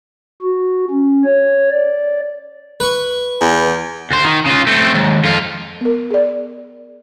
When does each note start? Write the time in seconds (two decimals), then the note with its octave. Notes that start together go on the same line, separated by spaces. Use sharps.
0.42 F#4
0.90 C#4
1.24 C#5
1.71 D5
2.80 B4 C#6
3.40 E2
4.10 D2 C5
4.24 D#3
4.46 C#3 F4
4.67 A3 C4
4.95 D#2 G#2
5.25 F2 F4
5.81 B3 A#4
6.11 G#4 D5